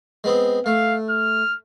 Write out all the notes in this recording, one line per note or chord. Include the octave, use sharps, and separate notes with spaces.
G#3 B3 C4
A3 F5
F6